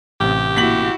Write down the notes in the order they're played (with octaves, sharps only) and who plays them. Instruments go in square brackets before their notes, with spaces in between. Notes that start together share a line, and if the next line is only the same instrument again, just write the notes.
[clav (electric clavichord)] A1 C3 [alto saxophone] G4
[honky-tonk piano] A#2 B6 F#7 [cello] E4 F#4